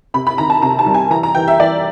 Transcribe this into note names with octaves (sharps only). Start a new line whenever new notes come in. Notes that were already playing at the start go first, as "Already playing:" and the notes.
C3 B5
B5
D#3 A#5
A5
C3 A#5
A5
G3
G#5
E3 A#5
A#5
E3 G5
E5
E3 D5